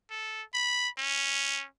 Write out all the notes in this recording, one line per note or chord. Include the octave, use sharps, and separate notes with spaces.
A4
B5
C#4